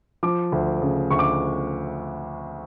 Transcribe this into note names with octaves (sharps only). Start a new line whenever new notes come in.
F3 D6
D2
C#3
D2 C#6
D6